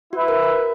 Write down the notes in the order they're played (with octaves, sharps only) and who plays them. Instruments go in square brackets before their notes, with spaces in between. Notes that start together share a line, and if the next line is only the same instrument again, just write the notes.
[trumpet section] E4 B4 E5 [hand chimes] F#4
[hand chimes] A#4
A#4